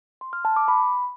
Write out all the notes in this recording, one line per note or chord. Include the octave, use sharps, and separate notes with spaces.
C6
F6
A5
D6
B5